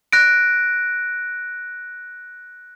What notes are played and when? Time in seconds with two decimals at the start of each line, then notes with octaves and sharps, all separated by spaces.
0.13 F#6 A#6 D7